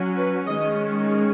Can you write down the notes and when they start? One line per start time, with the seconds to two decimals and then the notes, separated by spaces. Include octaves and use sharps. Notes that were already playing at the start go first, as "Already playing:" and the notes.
Already playing: F#3 C#4
0.16 B4
0.46 D#3 G#3 C#4 D#5